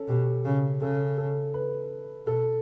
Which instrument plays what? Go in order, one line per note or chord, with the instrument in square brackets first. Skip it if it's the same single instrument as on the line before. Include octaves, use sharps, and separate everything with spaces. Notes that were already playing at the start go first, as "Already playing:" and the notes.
Already playing: [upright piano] C#4 A4
[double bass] B2 [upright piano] G4
[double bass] C#3
[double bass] C#3 [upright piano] A4
[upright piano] A4
B4
[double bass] B2 [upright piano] A4